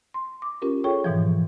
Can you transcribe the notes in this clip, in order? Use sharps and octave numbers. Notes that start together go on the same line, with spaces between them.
C6
D6
C#4 F4 G4 A#4
F4 G#4 A4 C#5 G5 C#6
G#2 B2 E3 F3